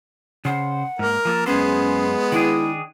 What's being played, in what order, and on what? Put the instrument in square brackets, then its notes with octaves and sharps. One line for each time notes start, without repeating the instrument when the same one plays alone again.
[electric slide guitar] C#3 C5 [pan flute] F#5
[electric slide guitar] G#2 A#3 [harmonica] A#4
[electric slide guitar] F3 A#3 A4
[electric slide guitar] F#2 G#4 C5 [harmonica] G#3 B3 [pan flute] C#4
[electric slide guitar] D#3 D4 G#4 [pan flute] E4